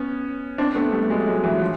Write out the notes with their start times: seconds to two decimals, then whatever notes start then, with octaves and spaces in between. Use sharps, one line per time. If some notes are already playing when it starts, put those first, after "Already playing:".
Already playing: B3 C#4
0.58 C4 D4
0.75 A3 B3
0.92 G3 A3
1.10 F#3 G#3
1.20 A3
1.26 F#3 G#3
1.44 E3 F#3
1.61 F3